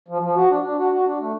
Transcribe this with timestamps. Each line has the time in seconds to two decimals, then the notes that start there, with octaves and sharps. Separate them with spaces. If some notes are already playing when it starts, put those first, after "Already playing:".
0.08 F3
0.22 F3
0.36 F#4
0.50 D4
0.64 D4
0.78 F#4
0.92 F#4
1.06 D4
1.19 A3